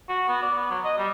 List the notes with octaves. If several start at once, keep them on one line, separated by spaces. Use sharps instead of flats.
F#4
B3
D5
B3
F#3
D#5
G3